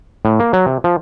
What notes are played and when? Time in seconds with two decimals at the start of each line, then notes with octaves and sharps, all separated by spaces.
0.25 A2
0.40 A#3
0.53 F#3
0.66 C3
0.84 F3